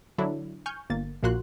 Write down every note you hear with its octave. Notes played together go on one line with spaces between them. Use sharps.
D3 F#3 D4 E4
G#5 C#6 F6 G6
G1 A#3 A6
A#1 A#2 A#3 F#4 C6 F#6